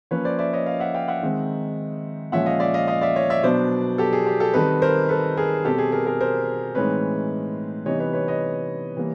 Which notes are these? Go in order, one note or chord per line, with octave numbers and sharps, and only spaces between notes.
F3 A#3 C#4 B4 C#5
C5 D5
D5 E5
C#5 D#5
D#5 F5
E5 F#5
F5 G5
E5 F#5
D#3 G#3 C4 D#4
A#2 F3 G#3 C#4 E5 F#5
D#5 F5
D5 E5
D#5 F5
D#5 F5
D5 E5
C#5 D#5
D5 E5
B2 F#3 B3 D4 C5 D5
G4 A4
G#4
G4
G4 A4
D#3 G3 C4 D#4 A4 B4
A#4 C5
A4 B4
G#4 A#4
B2 G3 C4 G4 A4
G#4
G#4 A#4
G#4 A#4
A#4 C5
A2 E3 G#3 C4 D#4 B4 C#5
C3 E3 G3 B3 D#4 C#5 D#5
B4 C#5
B4 C#5
C#5 D#5
E3 G3 A#3